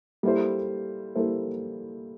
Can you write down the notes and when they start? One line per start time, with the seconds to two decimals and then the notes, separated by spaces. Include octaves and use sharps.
0.23 G3 A#3 E4 A4 C5
1.15 G3 A#3 E4 A4 C5